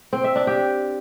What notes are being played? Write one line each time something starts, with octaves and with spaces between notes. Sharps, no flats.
C4
E5
D4
G4